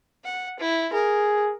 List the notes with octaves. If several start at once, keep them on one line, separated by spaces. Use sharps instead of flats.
F#5
E4
G#4 A#4